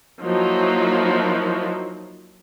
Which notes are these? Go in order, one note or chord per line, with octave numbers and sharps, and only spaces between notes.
F3 F#3 A#3 D#4 E4